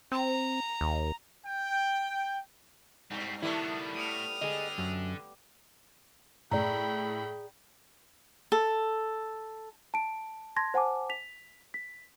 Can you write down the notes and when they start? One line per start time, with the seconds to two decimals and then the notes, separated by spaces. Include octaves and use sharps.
0.12 C4 A#5
0.81 D#2
1.46 G5
3.11 G2 G3 C4
3.43 D#3 G3 A3 B3 D4 E4
3.94 A2 D#6 F6
4.41 D3 G#4 D#5
4.78 F#2
6.51 A2 G#4 D5 G5 A#5 B5
8.52 A4
9.94 A5 D7
10.56 A5 C6 G#6 A#6
10.74 C5 F#5 G#5 A5 D6
11.10 B6 F7
11.74 B6